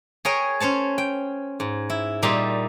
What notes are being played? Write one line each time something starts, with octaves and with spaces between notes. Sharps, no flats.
G#4 A#4 C#5 G5 G#5
C#4 C5 C#5 A5
G5
G#2
E4
A#2 G3 D#4 E4 C6